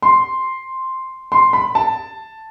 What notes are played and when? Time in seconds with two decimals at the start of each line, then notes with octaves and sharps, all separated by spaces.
0.02 C6
1.32 C6
1.53 B5
1.75 A5